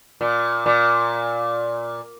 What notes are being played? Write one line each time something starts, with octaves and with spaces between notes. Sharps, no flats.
A#2
A#2